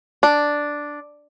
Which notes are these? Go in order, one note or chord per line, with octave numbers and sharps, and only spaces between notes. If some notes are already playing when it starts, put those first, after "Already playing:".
D4